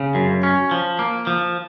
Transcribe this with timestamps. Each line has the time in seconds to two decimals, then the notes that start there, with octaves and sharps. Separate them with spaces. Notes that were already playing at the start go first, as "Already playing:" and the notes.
Already playing: C#3
0.15 F#2
0.43 C#4
0.71 F3
0.99 A#3
1.27 F3